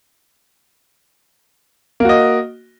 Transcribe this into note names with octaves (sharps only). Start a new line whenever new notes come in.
A#3 F#4 D#5